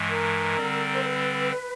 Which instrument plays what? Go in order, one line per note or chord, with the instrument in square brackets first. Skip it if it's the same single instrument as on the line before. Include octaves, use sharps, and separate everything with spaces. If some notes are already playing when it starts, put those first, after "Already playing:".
Already playing: [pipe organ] G2 E3 G#3
[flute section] A#4
[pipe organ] D3 G3 C4
[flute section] C5
B4